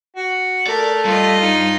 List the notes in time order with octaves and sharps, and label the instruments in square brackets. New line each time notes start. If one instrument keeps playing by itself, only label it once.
[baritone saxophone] F#4
[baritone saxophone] A3 [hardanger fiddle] A#4 [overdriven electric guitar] D5
[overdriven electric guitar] G2 [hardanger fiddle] F4 D#5
[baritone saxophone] D#4